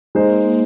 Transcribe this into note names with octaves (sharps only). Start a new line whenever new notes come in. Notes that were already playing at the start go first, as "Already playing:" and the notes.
G#3 A#3 D#4 C5